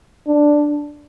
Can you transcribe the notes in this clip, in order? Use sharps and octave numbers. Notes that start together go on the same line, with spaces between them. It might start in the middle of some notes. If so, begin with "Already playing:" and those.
D4